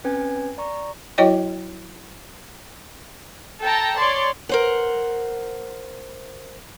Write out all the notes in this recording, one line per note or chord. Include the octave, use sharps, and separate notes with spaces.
C4 C#4 B4 G5 G#5 G#6
D5 A#5 C#6
F#3 E4 F#4 C#5 D#5 G5
A4 G5 A5 A#5
C#5 D5 C6
A#4 C5 F#5